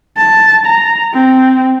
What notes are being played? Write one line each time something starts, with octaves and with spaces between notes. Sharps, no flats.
A5
A#5
C4